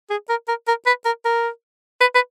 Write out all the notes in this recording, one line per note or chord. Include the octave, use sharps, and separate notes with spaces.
G#4
A#4
A#4
A#4
B4
A#4
A#4
B4
B4